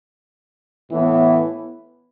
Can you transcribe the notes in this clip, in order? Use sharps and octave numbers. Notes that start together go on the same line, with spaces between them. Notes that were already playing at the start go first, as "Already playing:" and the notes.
A2 E3 B3